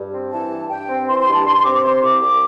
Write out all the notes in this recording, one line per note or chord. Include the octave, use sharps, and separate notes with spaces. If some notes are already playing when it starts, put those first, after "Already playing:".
Already playing: G2
C4
E3 A5
G2
G2 G5
C4
E3 C6
C6
G2
A5
G2 C6
C6
C4 D6
D6
C3 C6
C2 D6
C2 D6